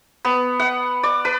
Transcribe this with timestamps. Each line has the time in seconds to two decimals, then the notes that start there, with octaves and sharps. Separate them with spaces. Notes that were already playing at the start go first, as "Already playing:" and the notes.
0.25 B3
0.59 F#5
1.03 D5
1.25 B4